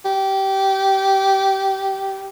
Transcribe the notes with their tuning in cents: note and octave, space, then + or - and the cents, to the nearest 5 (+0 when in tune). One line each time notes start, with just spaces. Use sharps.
G4 -20